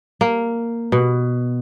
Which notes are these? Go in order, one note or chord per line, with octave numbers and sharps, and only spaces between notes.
A#3
B2